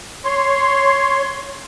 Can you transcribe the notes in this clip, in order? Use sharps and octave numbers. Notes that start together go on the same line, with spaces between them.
C#5 C6